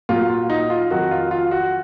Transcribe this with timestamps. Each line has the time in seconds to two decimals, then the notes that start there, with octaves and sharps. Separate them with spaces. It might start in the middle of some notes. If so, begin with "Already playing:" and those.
0.09 A#2 F#3 F4
0.30 F4
0.50 D#4
0.70 F4
0.90 F2 D#3 F#3 F#4
1.11 F4
1.31 F4
1.51 F#4